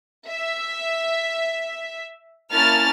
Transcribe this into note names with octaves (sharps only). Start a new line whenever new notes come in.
E5
A#3 C#4 E4 A5 F6 A6